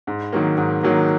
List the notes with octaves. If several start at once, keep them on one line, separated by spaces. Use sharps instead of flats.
G#2
D#3 F#3 A#3
G#2
D#3 F#3 A#3